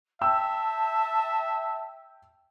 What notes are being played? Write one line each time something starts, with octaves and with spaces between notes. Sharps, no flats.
E5 G5 A5 E6